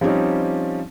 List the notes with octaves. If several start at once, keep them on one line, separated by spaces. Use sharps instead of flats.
F3 G3 C4 C#4 D#4 G4